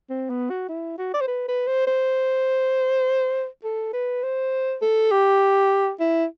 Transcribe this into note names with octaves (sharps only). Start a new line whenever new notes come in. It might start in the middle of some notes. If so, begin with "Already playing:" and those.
C4
B3
F#4
E4
F#4
D5
C5
B4
B4
C5
C5
A4
B4
C5
A4
G4
E4